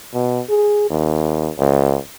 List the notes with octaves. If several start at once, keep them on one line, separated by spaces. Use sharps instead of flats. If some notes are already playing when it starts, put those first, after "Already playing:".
B2
G#4
D#2
C#2